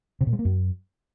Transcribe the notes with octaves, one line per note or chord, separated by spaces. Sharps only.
C3
A#2
G#3
A#3
F#2